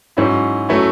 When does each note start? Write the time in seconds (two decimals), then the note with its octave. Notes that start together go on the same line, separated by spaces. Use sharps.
0.17 G#2 F#3 C#4 E4
0.69 F#3 A3 C#4 E4